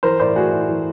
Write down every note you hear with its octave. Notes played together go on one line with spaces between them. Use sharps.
E3 A#4 C5
A2 C5 D5
A3 F#4 G#4
A2
E3